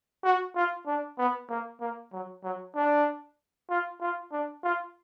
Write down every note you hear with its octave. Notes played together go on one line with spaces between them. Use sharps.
F#4
F4
D4
B3
A#3
A#3
F#3
F#3
D4
F4
F4
D4
F4